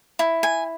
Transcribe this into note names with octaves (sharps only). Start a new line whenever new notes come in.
E4
G#5